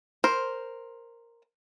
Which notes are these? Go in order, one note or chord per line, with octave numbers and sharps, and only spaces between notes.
A#4 C5